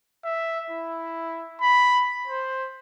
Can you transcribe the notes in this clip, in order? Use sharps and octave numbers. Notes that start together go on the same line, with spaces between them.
E5
E4
B5
C5